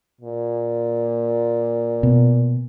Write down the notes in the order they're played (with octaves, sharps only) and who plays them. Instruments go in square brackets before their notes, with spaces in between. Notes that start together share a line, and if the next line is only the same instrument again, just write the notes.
[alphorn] A#2
[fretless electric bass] B2